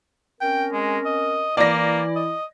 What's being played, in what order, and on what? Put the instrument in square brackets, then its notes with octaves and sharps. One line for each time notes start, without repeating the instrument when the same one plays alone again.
[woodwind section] C4 C#4 A#4 [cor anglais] G5
[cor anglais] G#3
D#5
[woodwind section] E3 E4 [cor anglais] A#3 [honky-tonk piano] D5 A#6
[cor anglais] D#5